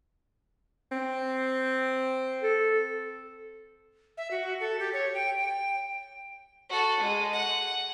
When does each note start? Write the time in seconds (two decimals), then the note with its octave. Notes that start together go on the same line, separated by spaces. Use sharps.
0.92 C4
2.42 A4
4.17 E5
4.31 F#4
4.60 A4
4.79 G4
4.93 C#5
5.14 G5
5.38 G5
6.70 F#4 A4
7.00 G#3
7.33 F#5